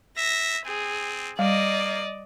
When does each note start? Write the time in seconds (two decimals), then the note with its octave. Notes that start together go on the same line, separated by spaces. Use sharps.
0.17 E5 A#6
0.66 C4 G#4
1.39 G3 A#3 D5 D#5